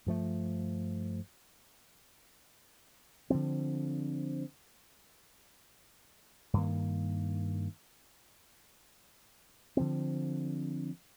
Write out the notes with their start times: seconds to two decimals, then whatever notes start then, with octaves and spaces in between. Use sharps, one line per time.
0.06 G2 F3 A3
3.30 D3 F3 C4
6.53 G2 D#3 A#3
9.77 D3 F3 C4